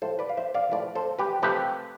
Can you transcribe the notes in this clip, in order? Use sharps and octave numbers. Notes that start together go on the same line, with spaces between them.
A2 F3 A3 A4 C5
B4 D5
F5
C5 E5
D5 F5
A2 F3 A3 B4 D5
A4 C5
G4 B4
C3 F3 A3 G4 B4